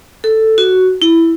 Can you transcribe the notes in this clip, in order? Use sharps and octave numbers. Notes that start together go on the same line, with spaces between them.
A4
F#4
E4